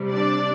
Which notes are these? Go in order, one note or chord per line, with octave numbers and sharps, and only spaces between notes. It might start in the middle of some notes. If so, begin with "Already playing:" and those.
Already playing: C3 G3
D4 D5